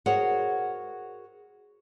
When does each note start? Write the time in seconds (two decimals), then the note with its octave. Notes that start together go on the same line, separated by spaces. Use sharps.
0.06 F#4 G#4 A#4 C5 C#5 F#5